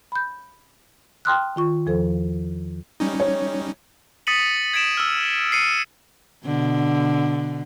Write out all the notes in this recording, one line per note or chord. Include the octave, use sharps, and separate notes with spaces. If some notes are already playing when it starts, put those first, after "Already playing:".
B5 G6
G5 A5 C6 D#6 F6 F#6
D#3 F4 C#6
E2 F3 A4 C5
G3 C#4 D#4
C#5
D#6 A6 B6 C#7 D#7 F#7
G#6 B6 D7 E7
E6 F6
C7 C#7 D#7
B2 D3